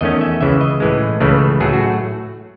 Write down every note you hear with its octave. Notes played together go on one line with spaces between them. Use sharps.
E2 D#3 A3 C#4 D#5
E5
C#2 C#3 E3 E5
D#5
A2 E3 G#3
C#2 C#3 E3 A3
A2 F#3 A3 G#4
F#4